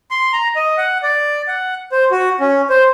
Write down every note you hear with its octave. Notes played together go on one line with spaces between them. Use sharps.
C6
A#5
D#5
F#5
D5
F#5
C5
F#4
C#4
C5